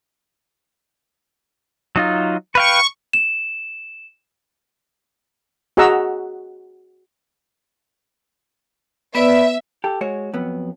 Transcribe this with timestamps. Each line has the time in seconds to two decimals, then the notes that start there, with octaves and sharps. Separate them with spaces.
1.96 F#3 D#4 F4
2.55 B4 F5 G5 C#6
3.13 E7
5.77 F#4 G#4 D#5 F#5 A#5 E6
9.15 B3 B4 D5 E5
9.84 G4 A4
10.01 G#3 F#4 C#5
10.33 F2 F#3 B3